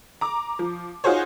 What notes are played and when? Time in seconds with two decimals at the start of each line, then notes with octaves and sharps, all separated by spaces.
0.21 A#5 D6
0.59 F3
1.04 D#4 F4 F#4 G#4 C5 C#5